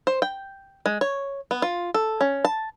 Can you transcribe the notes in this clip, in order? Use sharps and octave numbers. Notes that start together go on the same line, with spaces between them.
C5
G5
G#3
C#5
B3
F4
A4
C#4
A5